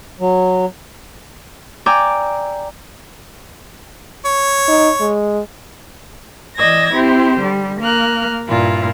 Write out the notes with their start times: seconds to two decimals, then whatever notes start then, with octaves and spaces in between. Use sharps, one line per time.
0.20 F#3
1.86 D5 G5 G#5 A#5 D6 E6
4.25 C#5
4.68 D#4
5.00 G#3
6.57 E3 D5 D#5 E6 G#6 A#6
6.92 C4 E4 G4 C5
7.39 D3 G3
7.80 A#3 F6 F#6
8.48 G2 A#2 E4 F4